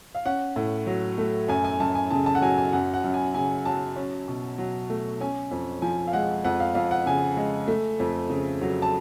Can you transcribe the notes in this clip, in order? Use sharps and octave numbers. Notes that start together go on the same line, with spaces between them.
F5
C#4 F#5
A2
F#3
A3
F#2 G#5
G#5
F#2 A5
G#5
C#3 A5
A5
F#5
F#3 G#5
G#5
F#2 F#5
F#5
F#2
G#5
C#3 G#5
F#3 A5
C#4
B2
F#3
A3
C#4 G#5
F2
F3 G#5
F5
G#3 F#5
F2 F#5
F5
F2 F5
F#5
C#3 G#5
G#3
A3
F2
C#3
F#3
A5